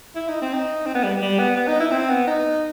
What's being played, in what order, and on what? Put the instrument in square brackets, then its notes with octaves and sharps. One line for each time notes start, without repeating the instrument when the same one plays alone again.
[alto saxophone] E4
D#4
C4
D#4
C4
B3
G3
G3
B3
B3
D#4
E4
C4
B3
D#4